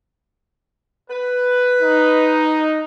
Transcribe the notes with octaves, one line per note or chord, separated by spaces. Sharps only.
B4
D#4